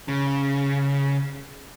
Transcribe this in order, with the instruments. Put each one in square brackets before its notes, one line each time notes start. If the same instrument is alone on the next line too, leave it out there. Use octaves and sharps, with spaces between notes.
[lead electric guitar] C#3